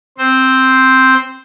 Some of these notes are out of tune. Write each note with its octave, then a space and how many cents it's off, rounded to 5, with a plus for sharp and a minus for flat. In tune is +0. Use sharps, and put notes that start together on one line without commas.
C4 +0 C5 +0